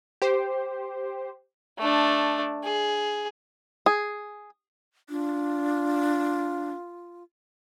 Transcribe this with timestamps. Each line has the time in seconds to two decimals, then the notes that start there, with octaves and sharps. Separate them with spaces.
0.22 G4 C5
1.78 A3 D4
2.64 G#4
3.86 G#4
5.10 D4 F4